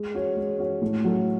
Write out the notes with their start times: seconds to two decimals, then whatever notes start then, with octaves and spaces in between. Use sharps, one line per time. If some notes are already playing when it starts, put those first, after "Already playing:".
Already playing: G#3
0.14 C#4 F#4 C#5
0.37 G#3
0.59 C#4 F#4 C#5
0.81 A2
1.04 F#3 A3 C#4